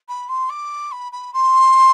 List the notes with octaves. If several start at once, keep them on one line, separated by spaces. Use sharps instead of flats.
B5
C6
D6
B5
B5
C6